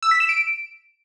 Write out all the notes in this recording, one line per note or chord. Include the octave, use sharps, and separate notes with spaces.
E6
B6
E7
D7